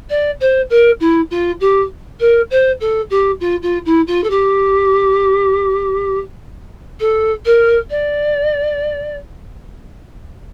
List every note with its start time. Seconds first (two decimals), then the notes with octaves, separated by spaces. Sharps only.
0.10 D5
0.40 C5
0.70 A#4
1.00 E4
1.31 F4
1.60 G4
2.20 A#4
2.51 C5
2.80 A4
3.10 G4
3.40 F4
3.63 F4
3.86 E4
4.07 F4
4.24 A4
4.30 G4
7.00 A4
7.45 A#4
7.90 D5